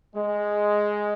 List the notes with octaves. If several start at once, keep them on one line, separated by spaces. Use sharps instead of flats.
G#3